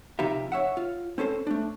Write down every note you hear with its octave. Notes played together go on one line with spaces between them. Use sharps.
C3 F3 D#4 G4 E5
C#5 E5 F#5
F4
C4 C#4 A4 C5
A3 D4